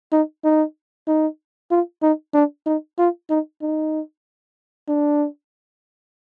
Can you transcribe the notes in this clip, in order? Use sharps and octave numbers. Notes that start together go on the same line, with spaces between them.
D#4
D#4
D#4
F4
D#4
D4
D#4
F4
D#4
D#4
D4